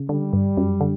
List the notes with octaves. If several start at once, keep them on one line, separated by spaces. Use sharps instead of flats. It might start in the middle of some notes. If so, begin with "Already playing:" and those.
Already playing: C#3
D3 G3
G2
F#2
D3